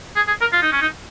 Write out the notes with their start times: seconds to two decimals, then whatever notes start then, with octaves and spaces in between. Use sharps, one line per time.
0.16 G#4
0.27 G#4
0.41 A#4
0.53 F4
0.62 D#4
0.72 C#4
0.81 D#4